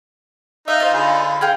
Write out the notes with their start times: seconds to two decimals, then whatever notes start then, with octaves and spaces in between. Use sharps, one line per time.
0.68 D#4 E5 F5
0.80 F4 C5
0.93 D3 G#4 B5
1.41 G#4 F5 G5